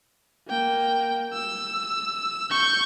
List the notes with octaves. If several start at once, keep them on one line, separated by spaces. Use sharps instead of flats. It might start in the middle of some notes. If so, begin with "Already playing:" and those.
A#3 G5
E6
C#6 G6